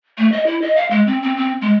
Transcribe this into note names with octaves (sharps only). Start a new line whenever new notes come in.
A3
D#5
E4
D#5
F5
G#3
C4
C4
C4
G#3